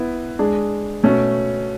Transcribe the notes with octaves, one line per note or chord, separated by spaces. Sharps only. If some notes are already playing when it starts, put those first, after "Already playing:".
Already playing: B3 E4 B4
G#3 D4 G#4
B2 A3 C#4